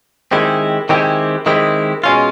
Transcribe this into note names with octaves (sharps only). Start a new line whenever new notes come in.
D#3 G#3 C4 E4 G4
D#3 G#3 C4 E4 G4
D#3 G#3 C4 E4 G4
B2 G#3 C#4 F4